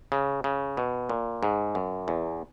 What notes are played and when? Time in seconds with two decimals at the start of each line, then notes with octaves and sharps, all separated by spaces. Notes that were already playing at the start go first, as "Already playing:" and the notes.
0.12 C#3
0.44 C#3
0.77 B2
1.09 A#2
1.43 G#2
1.75 F#2
2.08 E2